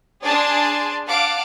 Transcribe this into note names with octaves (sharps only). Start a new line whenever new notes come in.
D4 G#4 D5 G#5 A5 C6
F5 F#5 A5 D6